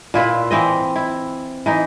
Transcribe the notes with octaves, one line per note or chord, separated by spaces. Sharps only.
A#2 E4 F4 B4
E3 C4 D#5
E4
E3 D#4